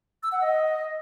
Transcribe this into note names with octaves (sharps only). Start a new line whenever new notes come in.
E6
F#5
D#5